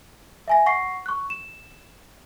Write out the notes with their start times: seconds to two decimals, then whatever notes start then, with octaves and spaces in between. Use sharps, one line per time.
0.48 E5 G#5 A#6
0.66 F#5 C#6 A#6 C7
1.06 C#6 F#6
1.30 E7